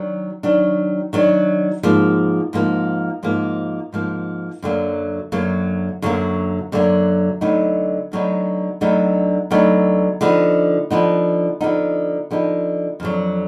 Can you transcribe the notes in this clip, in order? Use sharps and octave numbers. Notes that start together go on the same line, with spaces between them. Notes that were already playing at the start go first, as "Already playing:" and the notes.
Already playing: D#3 F#3 D4
D#3 F#3 D4
D#3 F#3 D4
G#2 F3 A#3
G#2 F3 A#3
G#2 F3 A#3
G#2 F3 A#3
F#2 D3 F#3 A#3
F#2 D3 F#3 A#3
F#2 D3 F#3 A#3
F#2 D3 F#3 A#3
D2 D3 F#3 B3 D#4
D2 D3 F#3 B3 D#4
D2 D3 F#3 B3 D#4
D2 D3 F#3 B3 D#4
D3 F3 B3 D#4
D3 F3 B3 D#4
D3 F3 B3 D#4
D3 F3 B3 D#4
F2 D3 F#3